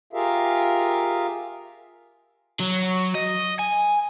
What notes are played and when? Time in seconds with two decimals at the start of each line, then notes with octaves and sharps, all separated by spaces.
0.13 F4 G4 G#4 A#4 E5 F5
2.60 F#3
3.15 D#5
3.59 G#5